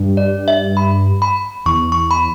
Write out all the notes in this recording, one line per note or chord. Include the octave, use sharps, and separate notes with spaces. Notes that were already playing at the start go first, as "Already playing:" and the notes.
Already playing: G2
D5
E5
B5
B5
E2 C#6
C#6
B5